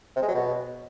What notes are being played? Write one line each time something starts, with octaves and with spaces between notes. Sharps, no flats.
C3
G#3
F#3
B2